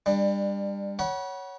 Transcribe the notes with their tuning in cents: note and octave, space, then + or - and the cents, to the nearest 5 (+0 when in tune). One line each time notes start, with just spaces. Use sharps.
G3 +30 D4 +15
C#5 +5 F#5 +20 B5 -35